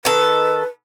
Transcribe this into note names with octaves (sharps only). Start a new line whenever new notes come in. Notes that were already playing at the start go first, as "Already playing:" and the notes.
D#3 A4 B4